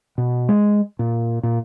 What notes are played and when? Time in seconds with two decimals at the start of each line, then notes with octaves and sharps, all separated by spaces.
0.18 B2
0.49 G#3
0.99 A#2
1.43 A#2